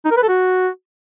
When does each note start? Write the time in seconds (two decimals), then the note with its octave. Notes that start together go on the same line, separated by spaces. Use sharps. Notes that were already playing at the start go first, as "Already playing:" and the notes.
0.05 D#4
0.11 A#4
0.17 B4
0.23 A4
0.29 F#4